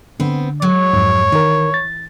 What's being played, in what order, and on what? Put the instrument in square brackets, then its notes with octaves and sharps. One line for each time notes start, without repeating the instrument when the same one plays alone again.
[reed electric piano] D3 [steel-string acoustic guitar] B3 C4
[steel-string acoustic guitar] F#3 G#3 [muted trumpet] C#5
[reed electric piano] F2 G#2
[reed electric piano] D#3 A#4 [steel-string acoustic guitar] E3
[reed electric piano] A6